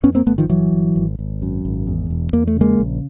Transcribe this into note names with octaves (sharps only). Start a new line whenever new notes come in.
F2 B3 C#4
A#3 C4
G1 A3 B3
D#3 F3
G1 E3 F#3
G1
G#1
G#1
F#2
G#1
E2
E1
E2 A#3
A3
C#3 G#3 A#3
A#1